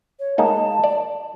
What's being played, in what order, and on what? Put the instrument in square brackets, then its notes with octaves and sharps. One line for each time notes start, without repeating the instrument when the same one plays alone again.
[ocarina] C#5
[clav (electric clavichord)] G#3 A#3 D#4 [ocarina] A5
[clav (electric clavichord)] D5